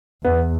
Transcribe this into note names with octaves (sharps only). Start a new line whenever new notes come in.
E2 B3